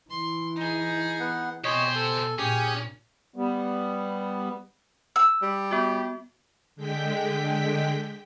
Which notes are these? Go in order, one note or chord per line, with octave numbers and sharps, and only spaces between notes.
E3 C6
D#4 G#4
B3 F#5
B2 G4 C5 C#5 D#5 G#5
A4
A#2 C#4 G4 G#4 D#6
G3 B3
E6
G3
B3 F#4
D3 G#3 G5 B6